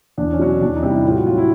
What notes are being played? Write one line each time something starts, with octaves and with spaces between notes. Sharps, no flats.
E2 D4
C#4
B2 F#3
C#4
E2 D4
D#4
C3 E3 G3
E4
A2 F4
F#4
F#3 F4
E4